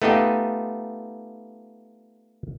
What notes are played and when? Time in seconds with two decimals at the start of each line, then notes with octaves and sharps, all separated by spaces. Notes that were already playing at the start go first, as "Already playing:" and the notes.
0.02 A3 B3 D#4 F4 G4 D#5